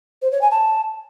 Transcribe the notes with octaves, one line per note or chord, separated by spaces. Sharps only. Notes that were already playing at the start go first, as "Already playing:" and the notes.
C5
C#5
G#5
A5